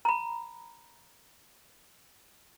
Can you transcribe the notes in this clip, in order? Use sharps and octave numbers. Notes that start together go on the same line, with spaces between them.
A#5 B5